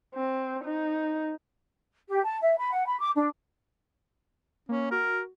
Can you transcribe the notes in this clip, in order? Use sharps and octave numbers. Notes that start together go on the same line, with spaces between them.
C4
D#4
G4
A5
E5
B5
F#5
B5
D6
D4
A#3 C#4
F#4 A#4